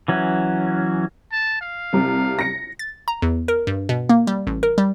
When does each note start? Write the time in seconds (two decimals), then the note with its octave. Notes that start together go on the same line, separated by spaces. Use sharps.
0.08 E3 F#3 C#4
1.32 A5
1.61 F5
1.93 C2 C3
2.39 A#6 C#7
2.79 A6
3.08 A#5
3.22 E2
3.48 A#4
3.67 G2
3.89 B2
4.09 A#3
4.27 G3
4.47 A1
4.63 A#4
4.78 G3